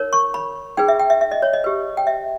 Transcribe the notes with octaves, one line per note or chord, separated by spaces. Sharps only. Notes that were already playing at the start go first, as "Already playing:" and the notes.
Already playing: D#4 A#4 C#5
C#6
B5
D#4 G#4 B4 G5
E5
G5
E5
E5
D#5
C#5
D#5
G4 B4
G5
E5